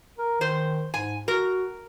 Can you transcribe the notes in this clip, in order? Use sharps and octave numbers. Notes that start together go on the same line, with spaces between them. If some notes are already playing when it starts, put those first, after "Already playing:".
A#4
D#3 C5
G#2 G#5
F#4 A#4